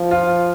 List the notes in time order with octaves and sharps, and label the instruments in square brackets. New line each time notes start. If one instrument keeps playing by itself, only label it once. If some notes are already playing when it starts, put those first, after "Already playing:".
Already playing: [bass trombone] F3
[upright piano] F4